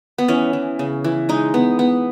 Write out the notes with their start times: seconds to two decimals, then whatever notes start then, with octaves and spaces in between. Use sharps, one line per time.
0.18 B3
0.28 E3 C#4
0.53 E3
0.79 C#3
1.04 E3
1.29 G#3 D#4
1.54 B3
1.79 B3